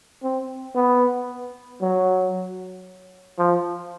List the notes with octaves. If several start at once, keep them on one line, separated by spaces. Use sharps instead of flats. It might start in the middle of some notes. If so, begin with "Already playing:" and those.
C4
B3
F#3
F3